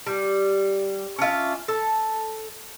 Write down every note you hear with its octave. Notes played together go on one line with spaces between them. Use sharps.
G3
C#4 D4 F4 E5
A4